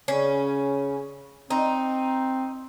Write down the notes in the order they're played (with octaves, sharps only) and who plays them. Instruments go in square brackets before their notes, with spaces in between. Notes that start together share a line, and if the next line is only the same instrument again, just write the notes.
[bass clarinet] C#3 [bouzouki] C#4
[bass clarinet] C4 [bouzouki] D#4